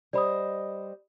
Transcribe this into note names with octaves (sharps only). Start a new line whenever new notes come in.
G3 C5 D5 D#5 B5 D#6